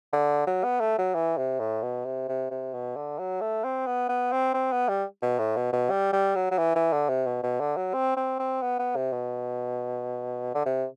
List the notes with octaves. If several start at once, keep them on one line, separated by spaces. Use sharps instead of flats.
D3
F#3
B3
A3
F#3
E3
C3
A2
B2
C3
C3
C3
B2
D3
F#3
A3
C4
B3
B3
C4
C4
B3
G3
B2
A2
B2
B2
G3
G3
F#3
F#3
E3
E3
D3
C3
B2
B2
D3
F#3
C4
C4
C4
B3
B3
C3
B2
D3
C3